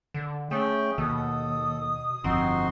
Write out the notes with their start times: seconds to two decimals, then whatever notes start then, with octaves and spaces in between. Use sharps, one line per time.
0.14 D3
0.51 A3 C#4 G#4 G5
0.98 D#2 B2 A4 D#6
2.24 G1 F2 C4 D#4 F#4 C6